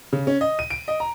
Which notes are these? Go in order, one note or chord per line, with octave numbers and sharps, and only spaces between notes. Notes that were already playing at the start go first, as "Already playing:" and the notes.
C#3
C#4
D#5
D#7
D7
D#5
A#5